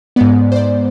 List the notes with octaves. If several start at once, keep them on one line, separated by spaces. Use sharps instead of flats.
G#2 G#3 B3 D5
C5
D5